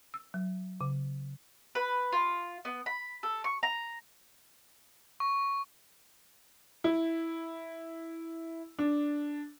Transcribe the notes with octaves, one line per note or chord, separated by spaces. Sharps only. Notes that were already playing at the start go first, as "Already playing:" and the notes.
E6
F#3
C#3
B4
F4
B3
B5
A4
C#6
A#5
C#6
E4
D4